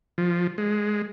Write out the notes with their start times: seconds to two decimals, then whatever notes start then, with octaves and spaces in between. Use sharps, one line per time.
0.18 F3
0.58 G#3